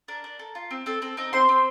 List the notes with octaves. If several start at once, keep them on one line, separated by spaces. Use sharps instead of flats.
D4 A#4
D4
A4
F4
C4
C4 A4
C4 A4
C4 D#4 D#5
C4 C5 C6
C4